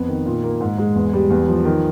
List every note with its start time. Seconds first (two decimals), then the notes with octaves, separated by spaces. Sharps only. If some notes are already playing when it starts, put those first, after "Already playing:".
Already playing: F2 B3
0.08 D#3
0.26 A#2
0.44 A#3
0.60 G#2
0.78 G#3
0.95 E2
1.13 G3
1.30 E2
1.48 F3
1.65 D#3